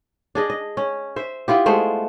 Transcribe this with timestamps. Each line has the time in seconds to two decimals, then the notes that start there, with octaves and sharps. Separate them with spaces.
0.35 D4 G#4 D#5
0.50 D#5
0.77 C#4
1.16 C5 E5
1.48 B3 E4 F4 G4
1.66 G#3 A3 B3 C5